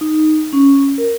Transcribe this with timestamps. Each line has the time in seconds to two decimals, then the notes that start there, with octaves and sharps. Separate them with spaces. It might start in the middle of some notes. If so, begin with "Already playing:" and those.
0.01 D#4
0.53 C#4
0.98 A#4